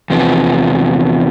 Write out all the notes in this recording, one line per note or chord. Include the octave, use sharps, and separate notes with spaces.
E2 C3 F3 B3